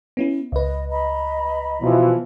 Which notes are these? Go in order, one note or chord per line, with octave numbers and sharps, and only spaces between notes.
B3 C#4 E4
C#2 B4 D#5
D#5 A#5 B5
B2 E3 F3